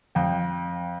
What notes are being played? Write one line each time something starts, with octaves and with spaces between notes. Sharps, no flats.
F2 G5